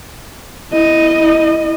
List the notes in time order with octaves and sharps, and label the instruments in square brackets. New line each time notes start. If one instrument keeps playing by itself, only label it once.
[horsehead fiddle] E4 D#5